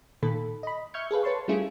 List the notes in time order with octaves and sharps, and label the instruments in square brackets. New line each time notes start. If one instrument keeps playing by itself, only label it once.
[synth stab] A#2 D#3 A4 B5
D#5 B5
E5 C#6 F6 G6 G#6 C#7
G#4 A4 B4 F5
B4 C#5 A5 C6 C#6
G3 A3 C#4 E4 F4 G#4